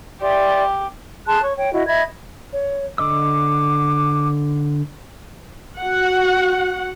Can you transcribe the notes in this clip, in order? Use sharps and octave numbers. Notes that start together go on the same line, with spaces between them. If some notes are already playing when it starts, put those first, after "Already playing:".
G4 D5 E5 C6
G#4 A5 C6 F#6
C#5 C#6
C#5 G5
E4 F#4 D#5
D#5 E5 B5 G#6
C#5
D3 D#5 D6 E6
F#4 F#5